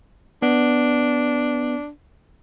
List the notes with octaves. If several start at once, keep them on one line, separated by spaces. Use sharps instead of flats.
B3 D4